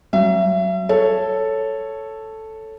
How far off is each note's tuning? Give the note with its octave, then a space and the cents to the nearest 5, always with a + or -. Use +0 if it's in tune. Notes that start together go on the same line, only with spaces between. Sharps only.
F#3 +15 E5 +35
A4 +0 C#5 +0